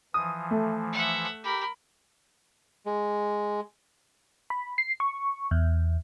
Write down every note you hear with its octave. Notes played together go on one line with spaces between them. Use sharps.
E3 F3 D#6
A3
E5 F#5
G4 A#4 B5
G#3
B5
C7
C#6
E2